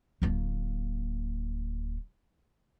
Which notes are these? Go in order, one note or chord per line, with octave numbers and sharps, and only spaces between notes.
D1 A#3